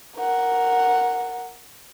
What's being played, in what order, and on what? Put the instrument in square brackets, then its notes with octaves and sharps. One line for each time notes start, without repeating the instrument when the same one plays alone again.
[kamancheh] A#4 F#5